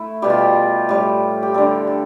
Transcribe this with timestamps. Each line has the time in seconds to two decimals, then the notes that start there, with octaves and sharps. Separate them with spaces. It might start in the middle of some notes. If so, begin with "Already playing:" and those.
Already playing: A3 E4
0.22 B2 G3 G4
0.30 F4
0.39 G4
0.89 A2 G3 G4
1.43 G4
1.54 D3 G3 A4
1.87 A4